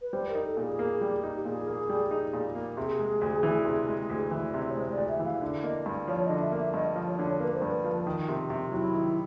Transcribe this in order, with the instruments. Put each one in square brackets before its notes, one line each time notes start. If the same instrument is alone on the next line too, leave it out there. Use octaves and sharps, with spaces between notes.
[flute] B4
[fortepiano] G3 [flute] C5
[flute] A#4
[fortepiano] D#4
[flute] A4
[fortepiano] A#2
[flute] G#4
[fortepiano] A#3
G3
D#4
[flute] G4
[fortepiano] A#2 [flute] G#4
[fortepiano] A#3
G3
D#4
A#2
A#3
[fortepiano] C3 [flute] G#4
[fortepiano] G#3
D2
E3
C3
G#3
D2
E3
C3
[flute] C#5
[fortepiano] G#3 [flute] C5
[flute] D5
[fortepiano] D2
[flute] E5
[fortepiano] E3
[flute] F5
[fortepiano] D3
[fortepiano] A#3 [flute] D#5
[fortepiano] G2
[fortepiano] F3 [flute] C#5
[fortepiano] D3 [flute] D#5
[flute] E5
[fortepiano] A#3
[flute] E5
[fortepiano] G2 [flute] D#5
[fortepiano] F3
[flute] C#5
[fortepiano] D3
[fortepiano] A#3 [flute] B4
[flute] C5
[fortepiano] G2
[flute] B4
[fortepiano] F3
[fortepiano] D#3 [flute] A#4
[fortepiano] C3
C3
[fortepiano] F#3 [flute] E4
[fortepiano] D#3